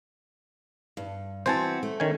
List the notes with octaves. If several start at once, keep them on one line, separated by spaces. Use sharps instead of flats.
G2
E3 C4 F#4 C5 G#5 A5
A3
D#3 C#4 G#5